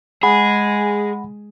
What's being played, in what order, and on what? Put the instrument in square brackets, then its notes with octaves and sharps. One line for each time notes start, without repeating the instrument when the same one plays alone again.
[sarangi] G#3 [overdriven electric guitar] G#4 [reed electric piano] F#5 B5